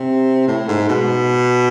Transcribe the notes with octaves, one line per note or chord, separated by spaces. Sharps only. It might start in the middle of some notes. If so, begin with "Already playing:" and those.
Already playing: C3
A2
G#2
B2